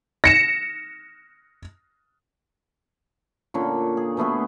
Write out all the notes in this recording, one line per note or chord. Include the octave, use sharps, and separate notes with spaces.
A#6 C#7 E7
A#2 D3 C#4
G#4
B2 A3 B3 G#4